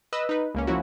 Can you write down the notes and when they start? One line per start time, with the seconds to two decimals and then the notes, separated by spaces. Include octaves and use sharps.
0.13 B4 D#5 E6
0.29 D#4 B4
0.55 C#2 A#3 C#4
0.67 F3 A#3 C#4 E4 F#4